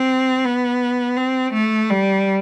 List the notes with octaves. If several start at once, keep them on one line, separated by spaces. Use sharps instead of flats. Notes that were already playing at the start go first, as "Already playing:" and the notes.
Already playing: C4
B3
C4
A3
G3